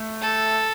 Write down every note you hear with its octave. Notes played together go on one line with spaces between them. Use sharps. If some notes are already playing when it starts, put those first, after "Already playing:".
Already playing: A3
A4